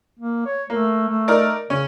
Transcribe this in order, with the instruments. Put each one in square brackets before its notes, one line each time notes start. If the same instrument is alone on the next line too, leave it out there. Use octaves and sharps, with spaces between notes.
[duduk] A#3
C#5
[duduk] A3 [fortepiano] A#3
[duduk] A3
[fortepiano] D#4 A#4 D5
[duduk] C#3 [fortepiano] C#4